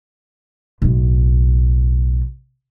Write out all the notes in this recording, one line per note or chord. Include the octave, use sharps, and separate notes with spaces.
B1 A2